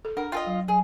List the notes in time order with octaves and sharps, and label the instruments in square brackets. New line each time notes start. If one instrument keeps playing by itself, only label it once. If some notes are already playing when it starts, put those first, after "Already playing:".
[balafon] A4
[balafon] D4 F#5 [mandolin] A#4
[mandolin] F4 A4 D#5 [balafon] G5
[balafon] F#3
[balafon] F#3 [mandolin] G#4